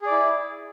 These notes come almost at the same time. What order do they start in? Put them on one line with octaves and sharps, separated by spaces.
G#4 D5 E4